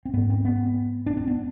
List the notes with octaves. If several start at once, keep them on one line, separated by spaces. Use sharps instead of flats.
C4
G#2 B3
C4
B3
D4
C4
B3